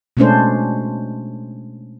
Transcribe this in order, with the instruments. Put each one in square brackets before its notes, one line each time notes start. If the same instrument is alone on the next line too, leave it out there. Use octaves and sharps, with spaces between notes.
[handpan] B2 G#3 A3 C#4 D4 C5